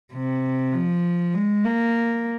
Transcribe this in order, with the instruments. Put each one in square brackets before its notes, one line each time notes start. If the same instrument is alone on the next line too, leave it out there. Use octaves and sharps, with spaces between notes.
[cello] C3
F3
G#3
A#3